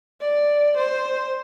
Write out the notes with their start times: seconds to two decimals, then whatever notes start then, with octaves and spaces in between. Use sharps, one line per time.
0.21 D5
0.77 C5